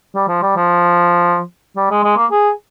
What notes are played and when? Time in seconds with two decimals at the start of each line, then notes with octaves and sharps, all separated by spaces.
0.15 G3
0.28 F3
0.42 G3
0.56 F3
1.76 G3
1.91 G#3
2.04 G#3
2.17 A#3
2.31 G#4